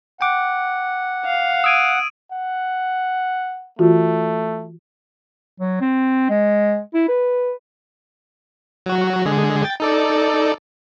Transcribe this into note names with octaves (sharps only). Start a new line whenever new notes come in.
F#5 G5 D6
F5
D#6 E6 G#6 D7 D#7
F#5
E3 A3 F4 F#4
F#3
C4
G#3
E4
B4
F#3 F#4
D3 G#3 G#4
G5 A6
D#4 A4 D5